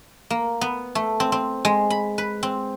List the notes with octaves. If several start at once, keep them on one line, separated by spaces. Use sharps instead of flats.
A#3
B3
A3
C4
C4
G#3
B5
B4
C4